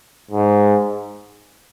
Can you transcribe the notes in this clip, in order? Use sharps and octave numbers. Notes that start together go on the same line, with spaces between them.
G#2